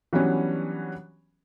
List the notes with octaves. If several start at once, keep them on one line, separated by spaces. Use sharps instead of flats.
E3 F#3 G3 B3 C#4 D4